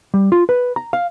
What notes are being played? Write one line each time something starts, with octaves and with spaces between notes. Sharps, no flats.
G3
F4
B4
A#5
F5